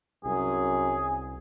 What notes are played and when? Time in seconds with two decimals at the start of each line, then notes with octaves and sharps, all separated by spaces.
0.24 C2 F#2 G#4